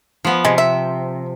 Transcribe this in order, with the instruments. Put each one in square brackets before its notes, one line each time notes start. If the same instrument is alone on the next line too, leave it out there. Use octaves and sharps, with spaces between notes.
[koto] F3 B3
[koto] C3 [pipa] G#3
[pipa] E5